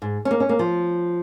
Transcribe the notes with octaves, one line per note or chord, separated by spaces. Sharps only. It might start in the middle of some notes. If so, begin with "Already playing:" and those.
G#2
C#4
A#3
C#4
A#3
F3